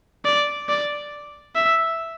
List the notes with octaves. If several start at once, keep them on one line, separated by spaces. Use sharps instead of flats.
D5
D5
E5